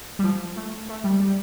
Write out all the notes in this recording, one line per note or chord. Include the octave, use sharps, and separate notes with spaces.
G3
F3
A3
A3
G3
G3